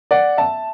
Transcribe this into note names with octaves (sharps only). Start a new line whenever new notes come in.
D5 F#5
E5 A5